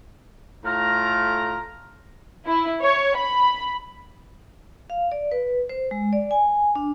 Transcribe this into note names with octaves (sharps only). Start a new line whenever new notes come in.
A2 A3 F4 A#4 A#5
E4
C#5
B5
F5
D5
B4
C5
G#3
D5
G#5
D4